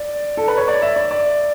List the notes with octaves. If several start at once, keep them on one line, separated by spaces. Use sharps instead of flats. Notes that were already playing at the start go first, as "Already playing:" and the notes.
Already playing: D5
A4
B4
C#5
D5
E5
D5
D5